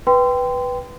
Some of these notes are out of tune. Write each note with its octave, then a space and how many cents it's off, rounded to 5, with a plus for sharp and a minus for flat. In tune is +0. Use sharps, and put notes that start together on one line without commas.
B4 +0 G5 +0 C6 -25